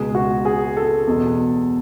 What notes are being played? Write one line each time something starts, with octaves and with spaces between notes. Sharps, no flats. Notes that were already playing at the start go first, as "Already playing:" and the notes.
Already playing: C#2 B2 G#4
F#4
G#4
A4
E2 B2